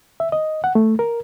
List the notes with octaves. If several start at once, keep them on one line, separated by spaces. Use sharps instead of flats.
E5
D#5
F#5
A3
A#4